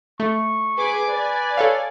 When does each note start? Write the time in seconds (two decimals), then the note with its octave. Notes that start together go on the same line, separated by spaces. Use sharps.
0.20 A3 C#6
0.77 G#4 B4 G#5 D6
1.08 B4 D5
1.57 A4 C#5 F5